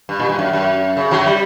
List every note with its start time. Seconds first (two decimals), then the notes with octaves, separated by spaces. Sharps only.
0.09 G2
0.20 A#2
0.29 G2
0.39 F#2
0.53 F#2
0.97 C#3
1.11 F#2 F#3
1.26 G3